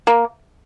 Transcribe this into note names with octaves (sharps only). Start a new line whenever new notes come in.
A#3